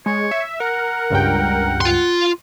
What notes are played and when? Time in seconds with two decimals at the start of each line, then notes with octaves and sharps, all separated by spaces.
0.06 G#3 C#5
0.31 E5
0.60 A#4 F#5
1.10 C#2 G2 G5
1.81 F4 C6